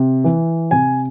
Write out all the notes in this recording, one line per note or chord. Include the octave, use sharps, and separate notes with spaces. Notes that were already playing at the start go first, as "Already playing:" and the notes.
Already playing: C3
E3
C3 G#5